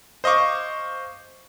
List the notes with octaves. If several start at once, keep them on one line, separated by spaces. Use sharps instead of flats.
C5 D#5 F5 C#6 D6